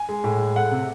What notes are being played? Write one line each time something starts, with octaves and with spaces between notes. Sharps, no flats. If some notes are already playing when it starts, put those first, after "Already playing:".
Already playing: G#5
G#3
A2
G#3
A3 F#5
C3